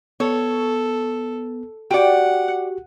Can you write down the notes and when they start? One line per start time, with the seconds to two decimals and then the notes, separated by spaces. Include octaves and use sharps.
0.20 B3 A4 C#5
1.91 F#4 G4 D5 F#5 G5